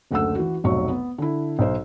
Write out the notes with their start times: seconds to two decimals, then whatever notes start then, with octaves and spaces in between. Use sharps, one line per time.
0.11 F#1 D2 A3 F#5 E6
0.35 E3 F#4
0.64 F1 B1 F#3 C#6
0.89 B3
1.18 D3 E4
1.59 B1 C5